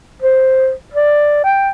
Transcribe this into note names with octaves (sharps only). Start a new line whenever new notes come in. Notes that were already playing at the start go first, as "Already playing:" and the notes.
C5
D5
G5